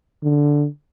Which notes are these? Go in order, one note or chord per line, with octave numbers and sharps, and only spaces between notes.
D3